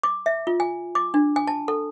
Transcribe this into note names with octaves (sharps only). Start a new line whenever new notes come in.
D6
E5
F4
G#5
D6
D4
G#5
A5
A4